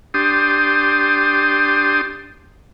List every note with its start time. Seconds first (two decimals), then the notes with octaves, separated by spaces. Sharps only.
0.14 D4 G4 C6 D#6